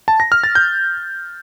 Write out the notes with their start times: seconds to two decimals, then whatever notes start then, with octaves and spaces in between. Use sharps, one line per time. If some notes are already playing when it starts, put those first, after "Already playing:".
0.08 A5
0.20 A#6
0.32 F6
0.44 A6
0.55 G6